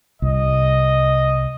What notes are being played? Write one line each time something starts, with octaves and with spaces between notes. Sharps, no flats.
C2 D#5